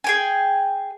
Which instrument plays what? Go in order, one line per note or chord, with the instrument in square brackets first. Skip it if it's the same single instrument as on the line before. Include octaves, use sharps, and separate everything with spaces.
[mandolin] G#4 G5 G#5